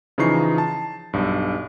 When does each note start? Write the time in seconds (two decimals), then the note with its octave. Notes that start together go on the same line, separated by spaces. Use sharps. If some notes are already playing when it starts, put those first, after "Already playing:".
0.18 C#3 E3 F3 D#4 C#6 C7
0.58 A5
1.13 B1 G2